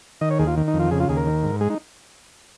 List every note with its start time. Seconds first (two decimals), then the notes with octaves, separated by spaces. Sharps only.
0.21 D#3 D#5
0.30 C#5
0.39 D#2 G#4
0.47 F4
0.57 D#3
0.68 D#4
0.74 F2
0.80 F4
0.91 C#3 G#4
1.00 F4
1.09 D#2 G#4
1.17 A#4
1.27 D#3
1.43 G#2
1.61 G#3 G#4
1.70 D#4